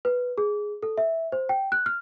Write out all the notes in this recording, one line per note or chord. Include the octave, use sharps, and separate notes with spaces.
B4
G#4
A4
E5
C5
G5
F#6
F6